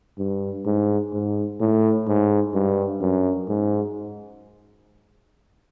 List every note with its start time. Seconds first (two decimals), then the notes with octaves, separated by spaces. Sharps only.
0.18 G2
0.66 G#2
1.13 G#2
1.60 A2
2.07 G#2
2.54 G2
3.01 F#2
3.49 G#2